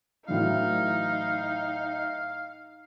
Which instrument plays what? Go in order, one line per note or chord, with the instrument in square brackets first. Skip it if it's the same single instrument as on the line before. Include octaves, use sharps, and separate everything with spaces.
[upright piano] A2 E3 F#3 [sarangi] D#4 [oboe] F5